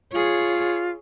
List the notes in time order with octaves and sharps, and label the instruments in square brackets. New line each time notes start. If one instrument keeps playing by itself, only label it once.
[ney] F4 [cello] G#4 C#5